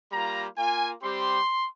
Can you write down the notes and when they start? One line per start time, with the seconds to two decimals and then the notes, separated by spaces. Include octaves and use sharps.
0.11 G3 A#3 F4 A#5
0.57 A#3 F4 G#5
1.03 G3 C4 G4 C6